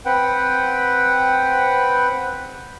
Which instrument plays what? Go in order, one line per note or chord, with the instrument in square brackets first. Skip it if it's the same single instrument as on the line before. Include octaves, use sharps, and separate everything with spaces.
[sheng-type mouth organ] C4 B4 F#5 G5